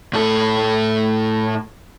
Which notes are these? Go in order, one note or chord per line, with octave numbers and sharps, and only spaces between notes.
A2 A4